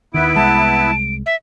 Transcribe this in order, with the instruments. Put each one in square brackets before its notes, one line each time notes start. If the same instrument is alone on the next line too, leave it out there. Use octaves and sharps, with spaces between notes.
[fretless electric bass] D#2 D#3 [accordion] B3 E4 [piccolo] D7
[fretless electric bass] C2 G#3 [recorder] A5
[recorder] E5